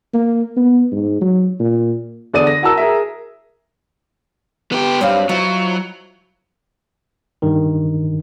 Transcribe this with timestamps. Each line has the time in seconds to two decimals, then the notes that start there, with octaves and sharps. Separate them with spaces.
0.13 A#3
0.56 B3
0.92 G#2
1.21 F#3
1.59 A#2
2.33 E2 D3 D5 D#6 D#7
2.47 A#6
2.62 E4 F#4 A#4 A5 E6
2.78 G#4 A#4 E5
4.72 B3 G4
5.01 G2 F#3 C4 F5
5.29 F3 F#3 D#4 E4
7.42 G2 D#3